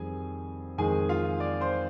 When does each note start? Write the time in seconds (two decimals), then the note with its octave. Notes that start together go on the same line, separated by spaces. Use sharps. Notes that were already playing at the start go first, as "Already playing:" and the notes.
Already playing: F2 D#3 G3 G#4 G#5
0.78 F2 D#3 G#3 G#4 G#5
1.09 F4 F5
1.40 D5
1.61 C5 C6